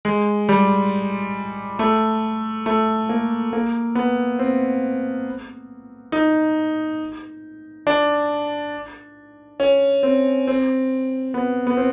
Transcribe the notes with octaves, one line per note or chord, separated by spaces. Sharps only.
G#3
G3
A3
A3
A#3
A#3
B3
C4
D#4
D4
C#4
C4
C4
B3
B3
C4